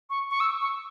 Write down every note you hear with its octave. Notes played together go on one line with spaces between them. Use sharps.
C#6
C#6
E6
C#6